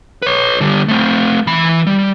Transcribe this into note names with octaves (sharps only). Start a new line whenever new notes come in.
B4 C#5
D3 G3
A3 C4
E3 B5
G3